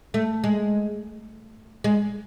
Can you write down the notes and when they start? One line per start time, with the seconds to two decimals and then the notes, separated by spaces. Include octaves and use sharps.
0.14 A3
0.44 G#3
1.84 G#3